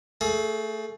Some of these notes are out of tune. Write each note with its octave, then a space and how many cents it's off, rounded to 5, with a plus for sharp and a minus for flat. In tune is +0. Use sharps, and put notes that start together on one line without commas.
A3 +15 G#4 +35